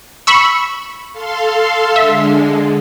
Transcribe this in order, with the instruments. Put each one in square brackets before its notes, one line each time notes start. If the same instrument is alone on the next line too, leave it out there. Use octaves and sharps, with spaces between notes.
[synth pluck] B5 C#6 E6
[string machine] A4 F5 C6
[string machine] D3 G#3 [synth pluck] E5